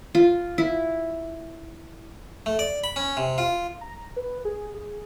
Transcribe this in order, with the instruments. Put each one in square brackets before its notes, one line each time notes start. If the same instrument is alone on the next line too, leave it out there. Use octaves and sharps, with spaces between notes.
[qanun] F4
E4
[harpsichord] A3
D5
B5
C#4
C3
F4
[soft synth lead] A#5
B4
G#4
G#4